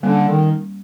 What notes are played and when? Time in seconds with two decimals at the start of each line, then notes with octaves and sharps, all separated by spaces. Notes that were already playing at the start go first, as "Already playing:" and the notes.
0.03 D3 G3 A#3 C#4
0.26 D#3